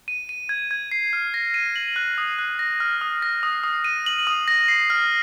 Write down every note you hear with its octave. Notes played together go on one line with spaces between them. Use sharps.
D#7
D#7
G#6
G#6
C7
F6
A#6
D#7
F#7
F#6
D#6
F#6
A#6
F6
D#6
A#6
D#6
D#6
D#7
F#7
D#6
A#6
C7
F6